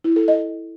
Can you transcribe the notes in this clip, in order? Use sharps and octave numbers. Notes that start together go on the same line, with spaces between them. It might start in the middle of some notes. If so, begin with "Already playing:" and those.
E4
A4
D#5